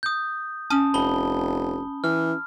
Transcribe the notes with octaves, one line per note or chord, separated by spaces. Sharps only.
D#6 G6
C#4 A5 D#6
F1 A5 B5 G7
E3 F6